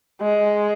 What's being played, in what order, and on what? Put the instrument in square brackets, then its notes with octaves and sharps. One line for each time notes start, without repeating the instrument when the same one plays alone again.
[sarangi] G#3